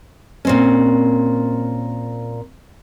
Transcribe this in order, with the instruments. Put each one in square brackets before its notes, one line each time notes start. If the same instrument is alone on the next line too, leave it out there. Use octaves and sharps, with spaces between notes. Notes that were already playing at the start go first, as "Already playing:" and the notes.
[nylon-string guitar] A#2 C4 C#4